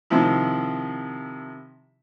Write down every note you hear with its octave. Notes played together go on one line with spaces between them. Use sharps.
C3 D#3 F3 E4